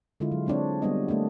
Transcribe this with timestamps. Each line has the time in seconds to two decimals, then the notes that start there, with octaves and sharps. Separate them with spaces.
0.20 D3 G#3 E4 F4
0.32 F#3
0.46 G#3 C4 D4 C#5
0.82 G3 B3 D4 D#5
1.08 A3 A#3 D4